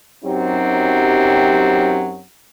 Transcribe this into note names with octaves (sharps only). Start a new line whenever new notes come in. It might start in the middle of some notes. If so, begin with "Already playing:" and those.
F#2 F#3 C4 D#4 G4